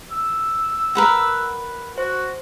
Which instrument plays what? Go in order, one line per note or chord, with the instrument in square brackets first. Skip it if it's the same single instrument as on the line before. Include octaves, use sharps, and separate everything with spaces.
[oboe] E6
[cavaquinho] A#4 B4 F#5
[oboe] F#4 [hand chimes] C5